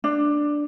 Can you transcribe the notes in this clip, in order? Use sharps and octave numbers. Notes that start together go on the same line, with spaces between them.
D4